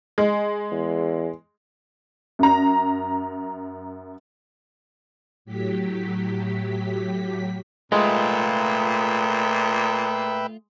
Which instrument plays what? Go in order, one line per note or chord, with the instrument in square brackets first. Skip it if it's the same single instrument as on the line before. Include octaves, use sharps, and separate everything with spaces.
[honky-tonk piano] G#3
[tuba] E2
[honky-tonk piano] F#2 A#5
[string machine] A2 F#3 G4 B6
[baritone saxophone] A#2 [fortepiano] G#3 [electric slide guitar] A3 F4 [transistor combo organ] B4 E5 G5